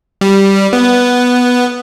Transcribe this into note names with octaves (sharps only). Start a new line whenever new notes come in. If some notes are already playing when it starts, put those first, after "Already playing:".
G3
B3